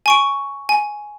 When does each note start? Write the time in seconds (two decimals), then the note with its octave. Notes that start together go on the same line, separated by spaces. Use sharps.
0.06 G#5 C#6 D7
0.69 G#5